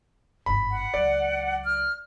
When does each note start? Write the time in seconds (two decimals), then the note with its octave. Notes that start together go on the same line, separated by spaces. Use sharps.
0.46 G1 G#2 B5
0.73 F#5
0.94 C#2 F#3 D5
1.64 F6